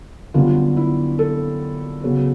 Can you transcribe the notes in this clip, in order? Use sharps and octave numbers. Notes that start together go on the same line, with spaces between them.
F#2 D3 G3 B3 F4
E4
A4
C#3 F#3 B3